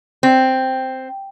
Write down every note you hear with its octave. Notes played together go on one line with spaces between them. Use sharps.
C4